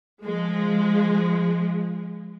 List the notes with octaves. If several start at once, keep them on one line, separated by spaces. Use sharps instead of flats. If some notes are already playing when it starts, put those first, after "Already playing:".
F3 G#3